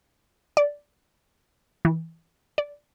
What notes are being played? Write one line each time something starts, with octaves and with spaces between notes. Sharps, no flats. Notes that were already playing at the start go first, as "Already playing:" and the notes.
D5
E3
D5